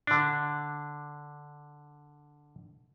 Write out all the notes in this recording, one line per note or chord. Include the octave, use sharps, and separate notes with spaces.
D3 D4